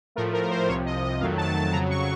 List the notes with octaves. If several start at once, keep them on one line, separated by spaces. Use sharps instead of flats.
A2 F3 A3 A#4
A#4
C5
C2 C3 F3 C#5
D#5
D#5
F2 D#3 F#3 A3 F5
A5
A5
F2 C#3 F#3 A#5
C#6